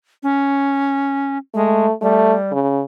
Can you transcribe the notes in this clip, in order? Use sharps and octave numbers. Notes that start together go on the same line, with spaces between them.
C#4
G#3 A3
G3 A3
C#3